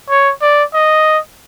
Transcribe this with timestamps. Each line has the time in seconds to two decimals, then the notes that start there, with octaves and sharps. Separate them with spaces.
0.10 C#5
0.42 D5
0.74 D#5